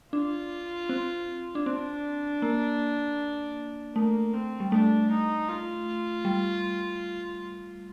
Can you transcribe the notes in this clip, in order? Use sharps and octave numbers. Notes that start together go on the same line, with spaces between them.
D4 F4
C4
D4
C4 D4
A#3
A3 A#3
C4
G3
A3 D4
D#4
F4
G3